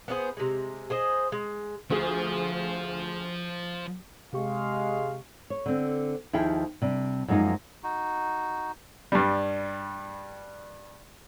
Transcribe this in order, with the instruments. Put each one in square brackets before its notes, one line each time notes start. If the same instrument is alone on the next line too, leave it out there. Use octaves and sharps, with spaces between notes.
[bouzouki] B3 D4 G#4 C5
C3 G#3
G#4 C5 D#5
G#3
[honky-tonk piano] D2 G#4 [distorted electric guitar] F3
[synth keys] C3 G4 C#6 [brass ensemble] G#3 F5
[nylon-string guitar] C#5
D3 C4
D#2 F3 E4 G#4 G5
C3 G3 D4
F#2 F3 G#3 A#3 D#4
[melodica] D#4 F#4
[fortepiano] G2 G3